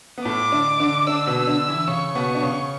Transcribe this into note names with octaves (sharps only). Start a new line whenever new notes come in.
B3
A2 A3 D6
D3 D4
D3 D4
D3 D4 E6
B2 B3
D3 D4
E3 E4
C#3 C#4 C#6
B2 B3
D4
C#3 C#4